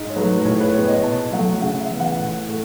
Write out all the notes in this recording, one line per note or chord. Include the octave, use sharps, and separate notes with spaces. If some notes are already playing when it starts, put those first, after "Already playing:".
Already playing: G#2 D#5
C#5
F#3 A3 B4
A2 C#5
B4
G#3 B3 C#5
D#5
B2 A5
F#3 A3 F#5
C#3 F#5
E5
E3 B3
F#5
A2
A3